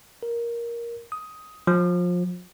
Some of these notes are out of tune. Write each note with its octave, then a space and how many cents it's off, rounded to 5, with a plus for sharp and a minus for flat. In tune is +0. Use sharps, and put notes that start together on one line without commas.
A#4 +10
D#6 +10
F3 +25